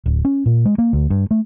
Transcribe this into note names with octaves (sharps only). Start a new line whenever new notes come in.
D1
C#4
A#2
G#3
A#3
D2
G2
A3